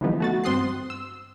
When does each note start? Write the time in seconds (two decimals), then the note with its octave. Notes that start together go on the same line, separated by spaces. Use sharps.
0.01 D3 E3 F3 G3 B3 D#4
0.20 A3 F#4 A6
0.44 G2 C4 C6 D#6 F#6 C7
0.90 E6